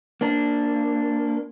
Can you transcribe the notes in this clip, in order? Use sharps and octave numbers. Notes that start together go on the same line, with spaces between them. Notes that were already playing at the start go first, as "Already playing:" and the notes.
A#3 D4